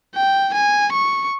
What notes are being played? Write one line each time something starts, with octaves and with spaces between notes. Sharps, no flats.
G5
G#5
C#6